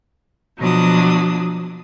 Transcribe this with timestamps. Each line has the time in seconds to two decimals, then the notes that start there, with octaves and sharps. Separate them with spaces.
0.59 B2 F3 F#3 D4 D#6